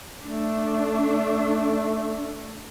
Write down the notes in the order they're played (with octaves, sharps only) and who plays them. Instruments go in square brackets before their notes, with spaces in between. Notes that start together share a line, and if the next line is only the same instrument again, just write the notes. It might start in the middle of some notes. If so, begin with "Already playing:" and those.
[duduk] A3 [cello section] D4